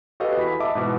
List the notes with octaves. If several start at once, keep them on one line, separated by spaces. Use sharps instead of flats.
F#4 G4 A4 B4 D#5 F5
E2 B5 B6
D#5 E5 A5 B5 D6
G#2 B2 E3